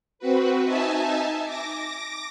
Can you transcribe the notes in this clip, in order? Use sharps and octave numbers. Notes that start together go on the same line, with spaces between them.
C4 F#4 B4
D#4 E5 G#5 A5
D6 A#6